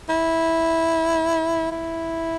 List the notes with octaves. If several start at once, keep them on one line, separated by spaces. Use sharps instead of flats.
E4
E4